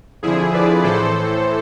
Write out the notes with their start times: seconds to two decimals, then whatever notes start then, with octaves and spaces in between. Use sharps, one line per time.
0.22 F2 D3 F3 E4 G#4
0.53 B4 D5
0.84 A2 E3 A4 C5